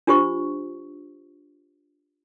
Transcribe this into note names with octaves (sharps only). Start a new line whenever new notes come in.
D4 F4 G4 C5 C#6